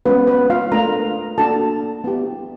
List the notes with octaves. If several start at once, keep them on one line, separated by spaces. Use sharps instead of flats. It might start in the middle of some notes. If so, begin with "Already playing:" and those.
G#3 B3 C#4 F4 B4
B3 B4
F4 F5
A3 D4 F4 A#4 A#5
A#3 D4 F#4 A4 A5
B3 E4 G4